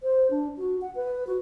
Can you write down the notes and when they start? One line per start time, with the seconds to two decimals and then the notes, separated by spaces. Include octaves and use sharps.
0.03 C5
0.31 D4
0.58 F#4
0.82 F#5
0.95 B4
1.27 F#4